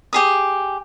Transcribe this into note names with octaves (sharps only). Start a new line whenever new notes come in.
G4 G#4 D#6